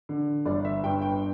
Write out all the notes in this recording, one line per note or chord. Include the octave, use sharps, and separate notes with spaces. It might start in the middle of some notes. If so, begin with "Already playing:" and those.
D3
G1 D5
E5
G2 G5
G5